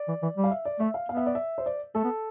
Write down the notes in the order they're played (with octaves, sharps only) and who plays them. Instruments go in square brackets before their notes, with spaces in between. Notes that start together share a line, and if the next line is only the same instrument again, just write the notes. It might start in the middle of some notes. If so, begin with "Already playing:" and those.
Already playing: [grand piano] D5
[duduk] E3
E3
G3
[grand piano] F5
E5
D5
[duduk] A3 [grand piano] E5
[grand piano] F5
[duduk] B3 [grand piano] F5
[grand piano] E5
D5
E5
C5
D5
[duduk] A3 [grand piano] A4
[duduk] B3